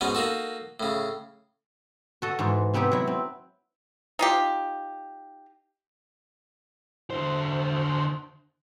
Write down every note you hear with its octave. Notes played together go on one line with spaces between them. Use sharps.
G#2 B2 B3 C#4
A#3 D#4 F#4 A4
A2 C#3
F#4 A4 D#5
G#2 E3 C5
C3 B3 C4 D#4 G4
F#3 E4
C4
D#4 F4 G4
D3 C5